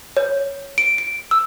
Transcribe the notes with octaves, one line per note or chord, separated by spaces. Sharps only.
C#5
D7
D7
E6